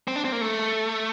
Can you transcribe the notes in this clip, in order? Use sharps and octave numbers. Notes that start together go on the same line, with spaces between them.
C4
D4
C4
A#3
A3